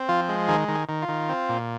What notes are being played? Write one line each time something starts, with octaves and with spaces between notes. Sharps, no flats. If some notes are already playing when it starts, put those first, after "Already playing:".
Already playing: C4
F3 F4
G#3
D#3 G#4
D#3
G#4
D#3
F4
D#3
C4
A#2